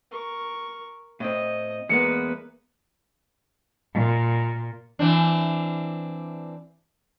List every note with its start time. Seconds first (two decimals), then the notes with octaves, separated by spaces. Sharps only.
0.11 A#4 C#6
1.20 A2 C4 D#5
1.89 E2 G#3 A#3 B3 B4 C#7
3.94 A#2
4.99 E3 C4 D4